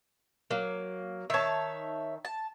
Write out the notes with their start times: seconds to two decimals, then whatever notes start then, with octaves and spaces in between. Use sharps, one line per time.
0.51 F#3 A#3
1.30 D#3 C#5 E5 A5
2.25 A5